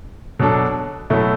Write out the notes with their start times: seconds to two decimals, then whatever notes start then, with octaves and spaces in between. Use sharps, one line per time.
0.39 B2 F#3 D4 A4
1.10 B2 F#3 A3 E4